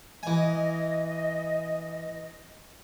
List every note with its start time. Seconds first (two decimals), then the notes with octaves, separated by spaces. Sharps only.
0.23 E3 D#5 G#5